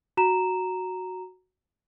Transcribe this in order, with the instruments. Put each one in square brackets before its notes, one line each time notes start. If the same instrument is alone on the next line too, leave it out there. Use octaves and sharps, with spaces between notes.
[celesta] F#4 A#5 E7